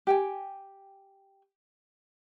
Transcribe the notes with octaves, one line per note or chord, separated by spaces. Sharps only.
G4 G5 G#5